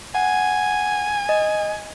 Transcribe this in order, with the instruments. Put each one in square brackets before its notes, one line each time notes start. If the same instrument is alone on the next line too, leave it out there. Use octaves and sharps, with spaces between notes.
[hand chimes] F#5 [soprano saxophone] G#5
[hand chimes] D#5